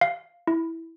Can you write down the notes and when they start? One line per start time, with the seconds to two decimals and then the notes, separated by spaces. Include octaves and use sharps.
0.01 F5
0.47 E4